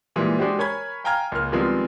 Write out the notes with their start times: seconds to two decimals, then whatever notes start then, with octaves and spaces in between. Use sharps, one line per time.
0.16 A#2 E3 G3 G#3
0.39 G#3 D4 F#4 G4 C5
0.58 A#4 C#5 G#5 B5 G#6
1.04 F5 G5 G#5 A#5 F6 G#6
1.32 C#2 A#3 F6
1.52 D#3 F3 G3 G#3 B3 C4